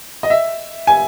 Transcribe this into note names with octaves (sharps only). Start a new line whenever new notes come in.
D#5
E5
G#5